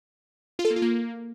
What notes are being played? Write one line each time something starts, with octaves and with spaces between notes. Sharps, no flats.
F4
A4
A#3
F4
A#3